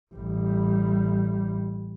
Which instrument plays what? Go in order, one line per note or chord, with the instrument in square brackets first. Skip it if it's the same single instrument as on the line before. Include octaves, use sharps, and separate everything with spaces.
[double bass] A1 G3